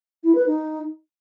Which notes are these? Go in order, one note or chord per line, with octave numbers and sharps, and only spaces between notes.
E4
B4
D#4